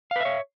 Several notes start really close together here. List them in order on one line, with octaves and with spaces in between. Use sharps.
F5 B4 E5 C#5